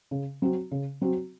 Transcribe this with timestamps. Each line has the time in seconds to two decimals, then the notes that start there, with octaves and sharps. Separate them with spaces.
0.11 C#3
0.42 F#3 C4 F#4
0.71 C#3
1.02 F#3 C4 F#4